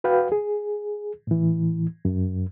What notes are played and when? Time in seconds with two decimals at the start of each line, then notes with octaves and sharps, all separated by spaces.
0.04 F#4 B4 F5 G5
0.32 G#4
1.27 A2 E3
2.05 F#2